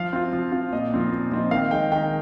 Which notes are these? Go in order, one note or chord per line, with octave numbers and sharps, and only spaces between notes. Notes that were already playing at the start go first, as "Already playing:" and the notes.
Already playing: F3 F5
C4 F4
F3
C4 F4
A#2 D#5
F3 C4 D#4
A#2
F3 C4 D#4
D#3 F5
G#3 D#4 G5
D#3 G5